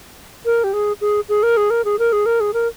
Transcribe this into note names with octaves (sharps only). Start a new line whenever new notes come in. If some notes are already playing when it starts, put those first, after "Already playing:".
A#4
G4
G#4
G#4
G#4
A#4
G#4
A#4
G#4
A#4
G#4
A#4
G#4
A#4